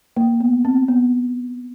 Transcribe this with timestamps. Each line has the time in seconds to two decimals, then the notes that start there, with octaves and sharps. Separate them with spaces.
0.17 A#3
0.40 B3
0.65 C4
0.88 B3